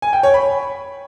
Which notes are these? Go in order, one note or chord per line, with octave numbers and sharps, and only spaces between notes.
G#5
G5
C#5
B5